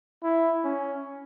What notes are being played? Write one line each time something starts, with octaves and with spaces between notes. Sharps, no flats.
E4
C#4